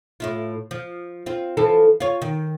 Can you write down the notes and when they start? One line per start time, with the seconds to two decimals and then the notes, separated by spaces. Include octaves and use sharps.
0.20 A2 E4 F4
0.71 F3
1.26 C4 F4
1.57 E3 F3 A4
2.00 F4 C#5
2.22 D#3